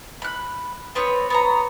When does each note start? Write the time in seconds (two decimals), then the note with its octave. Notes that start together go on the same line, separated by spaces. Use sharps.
0.22 B5 F#6
0.95 B3 C4 B4 C#5
1.30 B3 C#5 A#5